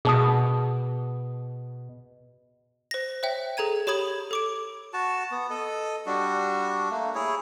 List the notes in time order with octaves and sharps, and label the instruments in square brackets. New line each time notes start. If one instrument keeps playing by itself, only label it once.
[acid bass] B2 [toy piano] G#4 A5 D#6
[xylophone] C5 A#6
C5 C#5 E5 G5
G#4 A4 A#5 G#6 D#7
G4 C#5 B5 D#6 G#6 F#7
A4 D6 D7
[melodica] F#4 A5
B3
A4 D#5
G3 D4 F#4
A3 A#3
E4 G#4 C#5